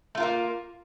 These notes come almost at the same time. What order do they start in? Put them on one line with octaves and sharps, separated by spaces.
A3 F4 A#4 A#3